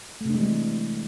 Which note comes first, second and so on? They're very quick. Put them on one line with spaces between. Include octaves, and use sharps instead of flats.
A3 C3 D4 G#3 E3